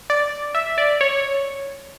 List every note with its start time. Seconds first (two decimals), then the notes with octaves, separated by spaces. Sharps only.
0.10 D5
0.55 E5
0.78 D5
1.01 C#5